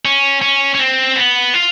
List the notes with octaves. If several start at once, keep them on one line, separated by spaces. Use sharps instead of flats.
C#4
C#4
C#4
C4
B3
F4